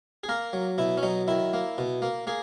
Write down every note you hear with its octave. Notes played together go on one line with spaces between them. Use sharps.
G#4
A#3 A#4
F#3
B2 E4
C#4
F#3 D#4
D#3 E4
A#3
B2
A#3
A#3 G#4